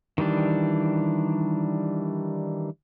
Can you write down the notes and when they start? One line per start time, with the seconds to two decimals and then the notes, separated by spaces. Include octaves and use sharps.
0.18 D#3 E3 G3 D4